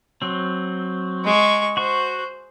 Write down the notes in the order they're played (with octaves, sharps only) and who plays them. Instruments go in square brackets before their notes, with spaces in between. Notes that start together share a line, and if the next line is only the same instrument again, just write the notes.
[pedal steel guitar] F#3 C4
[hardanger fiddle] G#3 C#6
[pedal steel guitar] F#4 C#6 [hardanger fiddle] C5